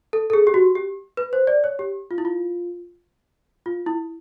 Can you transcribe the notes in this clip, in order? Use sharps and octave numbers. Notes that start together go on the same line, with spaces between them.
A4
A4
G#4
G4
F#4
G4
B4
C5
D5
C#5
G4
F4
E4
F4
F4
E4